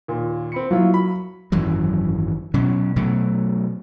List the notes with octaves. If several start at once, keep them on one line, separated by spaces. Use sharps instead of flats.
D#2 A#2
C4 B5 C#7
F#3 A#3 E4 F4
B5
G#1 F#2 E3 F#3
B2 F#3 C#4
B2 F#3 A3